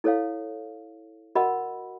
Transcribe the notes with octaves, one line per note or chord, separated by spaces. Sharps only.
E4 A4 C#5 F5
F#4 A#4 D#5 F#5 B5